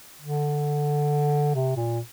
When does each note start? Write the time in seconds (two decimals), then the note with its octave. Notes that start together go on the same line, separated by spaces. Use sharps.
0.22 D3
1.55 C3
1.76 A#2